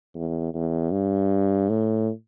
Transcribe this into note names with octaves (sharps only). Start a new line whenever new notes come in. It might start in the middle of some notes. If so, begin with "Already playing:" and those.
E2
E2
G2
A2